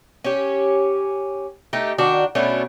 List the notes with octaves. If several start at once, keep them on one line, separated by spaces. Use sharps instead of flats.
C#4 G4
A3 D#4 G4
D#3 D4 F#4
B2 A3 C#4 D4